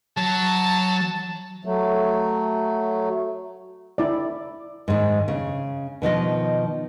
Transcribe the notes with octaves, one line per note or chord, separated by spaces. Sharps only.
F#3 A5
F#3 A3
E4 D5
G#2 D#3
C#3
B2 D#3 F3 D#5